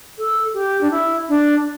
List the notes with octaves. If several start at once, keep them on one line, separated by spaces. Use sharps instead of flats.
A4
G4
D4
E4
D4